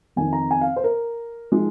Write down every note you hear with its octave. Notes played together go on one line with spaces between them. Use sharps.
F2 D#3 C4 D#4 G#5
A#5
G#5
F5
C5
A#4
F3 G#3 D#4